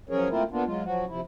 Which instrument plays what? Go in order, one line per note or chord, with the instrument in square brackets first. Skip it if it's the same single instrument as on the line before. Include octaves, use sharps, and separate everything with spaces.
[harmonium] F3 F#3 C#4 G#4 A#4 C#5
A3 A#3 C4 E4 F4 A#4
A#3 B3 D4 F4
F#3 G#3 F4
F3 F#3 F#4
C3 F3 E4